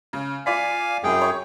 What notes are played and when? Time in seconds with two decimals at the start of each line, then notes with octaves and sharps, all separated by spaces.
0.13 C#3
0.46 F4 D5 F5 G#5 B6
1.04 C2 F#2 G#4 G5
1.21 C#5